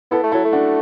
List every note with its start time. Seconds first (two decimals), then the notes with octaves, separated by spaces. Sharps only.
0.11 B3 E4 A4
0.23 A3
0.32 F#3 E4 A4
0.45 A3
0.53 D4 F#4